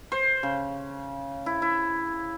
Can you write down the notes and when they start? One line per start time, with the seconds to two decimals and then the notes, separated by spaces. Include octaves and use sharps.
0.12 C5
0.43 C#3
1.46 E4
1.62 E4